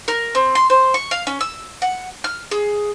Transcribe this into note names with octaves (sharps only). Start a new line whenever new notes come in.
A#4
C4
C6
C5
C#6
F5
C#4
E6
F#5
F6
G#4